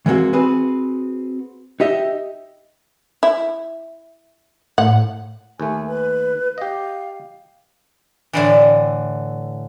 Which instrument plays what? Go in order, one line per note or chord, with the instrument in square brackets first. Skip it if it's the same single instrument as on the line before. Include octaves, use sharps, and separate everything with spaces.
[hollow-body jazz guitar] E3 G#3 A#3 C4 F#4
C4 F#4 G#4 B4
D#4 G4 D#5 E5
[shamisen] E4
[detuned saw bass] A2 [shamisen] F#5
[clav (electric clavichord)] D#2 A3 [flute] G#5
[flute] B4
[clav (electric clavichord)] G4 D#5 [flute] F5
[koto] A2 D3 E3